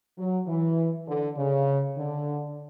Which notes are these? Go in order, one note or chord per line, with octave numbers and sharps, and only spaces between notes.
F#3
E3
D3
C#3
D3